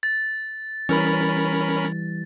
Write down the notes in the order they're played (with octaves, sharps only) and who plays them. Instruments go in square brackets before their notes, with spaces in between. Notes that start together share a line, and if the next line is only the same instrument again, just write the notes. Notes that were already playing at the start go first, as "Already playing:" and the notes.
[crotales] A6
[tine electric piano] E3 G3 [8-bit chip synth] C#4 A#4 B5